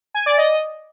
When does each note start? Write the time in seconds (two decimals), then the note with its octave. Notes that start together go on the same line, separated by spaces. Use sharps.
0.14 G#5
0.26 D5
0.38 D#5